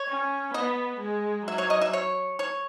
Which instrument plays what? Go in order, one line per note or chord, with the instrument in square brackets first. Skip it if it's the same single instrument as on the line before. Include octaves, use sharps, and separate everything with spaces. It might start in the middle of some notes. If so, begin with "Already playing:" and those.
Already playing: [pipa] C#5
[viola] C#4
[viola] B3 [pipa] D#5
[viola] G#3
[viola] F#3 [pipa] E5
[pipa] C#5
D#5
E5
C#5
C#5